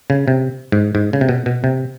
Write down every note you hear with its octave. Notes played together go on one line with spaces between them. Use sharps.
C#3
C3
G#2
G#2
C#3
C3
B2
B2
C3